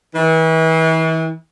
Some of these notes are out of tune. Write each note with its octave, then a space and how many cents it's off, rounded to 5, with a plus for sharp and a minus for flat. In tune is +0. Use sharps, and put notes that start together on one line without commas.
E3 -35